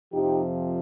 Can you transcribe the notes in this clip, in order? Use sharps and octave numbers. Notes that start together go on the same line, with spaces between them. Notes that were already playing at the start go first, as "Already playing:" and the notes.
F2 C3 F3 D#4 G4